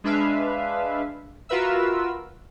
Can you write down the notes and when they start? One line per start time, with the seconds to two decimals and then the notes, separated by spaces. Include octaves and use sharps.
0.04 G#3 D4 B4 E5 F5
1.49 F4 F#4 A#4 B4 E5 E6